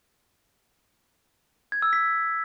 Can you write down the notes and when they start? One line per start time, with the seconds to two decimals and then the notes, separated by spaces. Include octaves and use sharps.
1.72 G#6
1.82 E6
1.93 B6